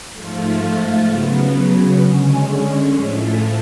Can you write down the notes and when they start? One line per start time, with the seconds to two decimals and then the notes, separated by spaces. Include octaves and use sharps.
0.13 G#2 F3 A3 F4
1.06 C#3 F#3 B3
1.98 D3 G#3 C#4
2.90 A2 F3 A3